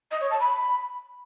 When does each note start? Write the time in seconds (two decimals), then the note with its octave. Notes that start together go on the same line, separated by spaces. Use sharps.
0.11 D#5
0.21 C#5
0.31 A5
0.40 B5